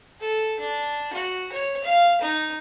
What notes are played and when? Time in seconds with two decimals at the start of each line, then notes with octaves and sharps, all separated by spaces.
0.20 A4
0.60 D4
1.13 F#4
1.53 C#5
1.84 F5
2.21 D#4